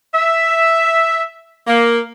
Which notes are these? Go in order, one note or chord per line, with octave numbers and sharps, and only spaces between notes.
E5
A#3